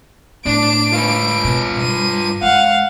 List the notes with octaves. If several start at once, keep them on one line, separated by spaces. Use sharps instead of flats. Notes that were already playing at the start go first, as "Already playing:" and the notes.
A2 D4 D7
F4 B4
B2
G2 D#7
G#3 F5 F#5